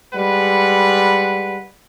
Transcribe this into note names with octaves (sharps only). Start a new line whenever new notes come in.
G3 G#3 B4 F#5